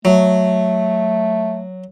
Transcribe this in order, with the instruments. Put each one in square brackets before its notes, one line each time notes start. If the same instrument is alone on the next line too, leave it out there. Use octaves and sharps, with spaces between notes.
[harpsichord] F#3 [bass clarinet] A3